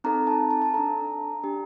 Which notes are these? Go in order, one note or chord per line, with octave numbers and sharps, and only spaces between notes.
C4 D#4 A4 A#5
A5
A5
A5
D4 A4 A#5
D4 G4